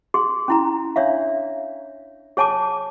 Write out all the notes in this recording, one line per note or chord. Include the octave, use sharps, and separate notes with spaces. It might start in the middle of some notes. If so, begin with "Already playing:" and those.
G#4 C6
C#4 E4 A#5
D4 C#5 E5 F5
G#4 C#5 G#5 A5 D6